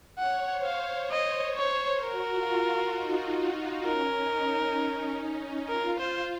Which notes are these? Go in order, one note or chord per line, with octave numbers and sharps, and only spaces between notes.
C#5 F#5
C5
F5
D#5
C#5
F#4 A#4
F4
F4
D#4
C#4 A#4
D#4
C#4
F4 A#4
C5